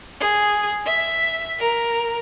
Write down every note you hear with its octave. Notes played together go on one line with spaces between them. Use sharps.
G#4
E5
A#4